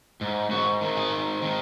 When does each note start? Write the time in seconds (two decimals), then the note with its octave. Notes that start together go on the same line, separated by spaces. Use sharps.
0.21 G#2
0.51 G#2 F#4
0.81 D#3
0.97 G#4
1.12 G#2
1.42 D#3